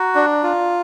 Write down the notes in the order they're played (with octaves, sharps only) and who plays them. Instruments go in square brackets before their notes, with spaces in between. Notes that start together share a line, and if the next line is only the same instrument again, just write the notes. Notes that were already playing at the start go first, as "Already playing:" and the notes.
Already playing: [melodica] F#4 [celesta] A#5
[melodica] D4
F4